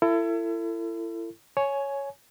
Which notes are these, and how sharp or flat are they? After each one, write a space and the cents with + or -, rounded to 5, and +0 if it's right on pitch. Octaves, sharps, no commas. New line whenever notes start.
E4 +30 A4 +35
C#5 +0 G#5 +15